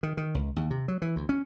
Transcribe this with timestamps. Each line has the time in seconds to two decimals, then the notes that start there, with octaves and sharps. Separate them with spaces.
0.03 D#3
0.17 D#3
0.34 C#2
0.56 D#2
0.70 C3
0.88 F#3
1.02 E3
1.16 D2
1.29 C#4